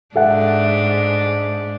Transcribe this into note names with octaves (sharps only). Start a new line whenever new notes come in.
G#2 D4 A4 E5 F#5